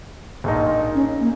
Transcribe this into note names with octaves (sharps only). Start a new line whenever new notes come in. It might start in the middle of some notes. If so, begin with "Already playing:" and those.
A#1 A#2 A#3 D#4
C#4
A#3